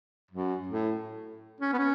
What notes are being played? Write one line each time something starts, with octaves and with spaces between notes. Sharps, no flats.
F#2
A2
C#4
B3
C#4